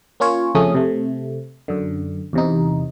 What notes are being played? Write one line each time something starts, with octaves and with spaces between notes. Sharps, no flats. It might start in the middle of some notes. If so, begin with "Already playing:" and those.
A#3 C#4 F4 C#5
F2 C#3 A3 C#4 D#6
C3 A3
F#2 D3
E2 C3 D#4